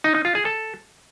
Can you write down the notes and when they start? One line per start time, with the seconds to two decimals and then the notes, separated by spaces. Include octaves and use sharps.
0.04 D#4
0.15 D#4
0.25 F4
0.35 G#4
0.45 A4